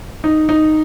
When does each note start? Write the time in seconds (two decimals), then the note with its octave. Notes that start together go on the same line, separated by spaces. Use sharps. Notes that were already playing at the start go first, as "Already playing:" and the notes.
0.24 D#4
0.49 D#4